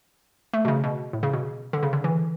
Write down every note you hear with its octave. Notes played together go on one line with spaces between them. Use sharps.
A3
B2
C#3
B2
A2
C#3
B2
D3
C#3
D3
E3